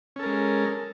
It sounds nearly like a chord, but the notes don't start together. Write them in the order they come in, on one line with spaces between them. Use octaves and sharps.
C#4 A4 A#4 G#3